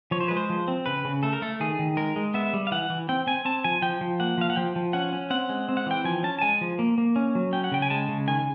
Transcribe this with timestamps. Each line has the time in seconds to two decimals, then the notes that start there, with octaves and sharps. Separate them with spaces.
0.11 F3 C#5
0.20 C5
0.28 G#3 B4
0.37 C5
0.50 F3
0.68 C4
0.86 C#3 B4
1.05 C#3
1.23 A3 A4
1.33 A#4
1.42 A3 A4
1.60 D#3 G#4
1.79 D#3
1.97 G#3 A#4
2.16 G#3
2.34 B3 E5
2.53 G3
2.67 F5
2.71 E3 F#5
2.90 E3
3.09 C4 G5
3.27 C4 G#5
3.45 C4 A5
3.64 F3 G#5
3.82 F3 G5
4.01 F3
4.20 A#3 F#5
4.38 F3 F5
4.50 F#5
4.56 F3 G5
4.76 F3
4.93 C#4 F#5
5.13 C#4
5.30 C4 F#5
5.49 G#3
5.69 C4
5.77 F#5
5.86 E3 G5
6.04 F3 G#5
6.23 C#4 A5
6.39 A5
6.42 G#3 G#5
6.61 F3
6.79 A#3
6.98 A#3
7.16 C#4
7.35 F#3
7.53 C#4 G5
7.64 F#5
7.72 C#3 G5
7.82 G#5
7.90 G#3 A5
8.09 C#3
8.28 D#3 G#5